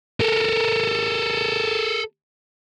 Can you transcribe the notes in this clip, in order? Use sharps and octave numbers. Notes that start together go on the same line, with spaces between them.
A4 A#4